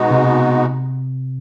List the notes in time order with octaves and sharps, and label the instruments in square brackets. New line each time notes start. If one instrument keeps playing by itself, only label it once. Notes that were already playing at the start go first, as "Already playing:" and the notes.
Already playing: [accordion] B2 G#3 B3 D#4 F#4
[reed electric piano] C3